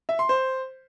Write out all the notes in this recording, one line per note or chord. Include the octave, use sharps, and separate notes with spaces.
E5
C6
C5